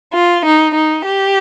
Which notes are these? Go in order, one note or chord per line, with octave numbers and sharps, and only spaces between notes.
F4
D#4
D#4
G4